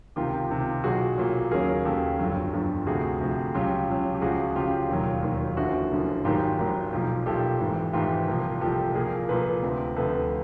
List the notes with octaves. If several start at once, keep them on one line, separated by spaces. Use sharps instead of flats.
C#2 C3 D#3 F4 G4
C#2 C3 D#3
B1 A#2 F#3 F#4 G#4
B1 A#2 F#3
D#2 C#3 F#3 G#4 A#4
D#2 C#3 F#3 G4 A4
G1 F2 D3 F#3
G1 F2 D3 F#3
D2 C3 F3 F#4 G#4
D2 C3 F3
C#2 C#3 F#3 F4 G4
C#2 C#3 F#3
G4
C#2 C#3 F3 F#4 G#4
C#2 C#3 F3 F4 G4
E1 D#2 D#3 F#3
E1 D#2 D#3 F#3
F#1 F#2 D3 F3 E4 F#4
F#1 F#2 D3 F3
G#1 G#2 D#3 F#3 F4 G4
G#1 G#2 D#3 F#3
B1 A#2 F3
B1 A#2 F3 G4 A4
G#1 G#2 E3
G#1 G#2 E3 F4 G4
C2 A#2 F3
C2 A#2 F3 G4 A4
C2 A#2 F3 G#4 A#4
C2 A#2 F3 A4 B4
D2 C3 F3
D2 C3 F3 A4 B4